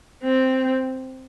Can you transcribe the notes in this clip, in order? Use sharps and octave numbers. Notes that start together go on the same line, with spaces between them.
C4